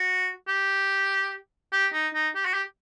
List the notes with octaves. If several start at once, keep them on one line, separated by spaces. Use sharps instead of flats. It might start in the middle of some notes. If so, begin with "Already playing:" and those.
Already playing: F#4
G4
G4
D#4
D#4
G4
F#4
G4